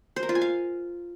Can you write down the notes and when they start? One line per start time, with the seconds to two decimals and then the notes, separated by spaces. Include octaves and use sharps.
0.16 C5
0.23 A#4
0.29 F4
0.35 G#5
0.42 F5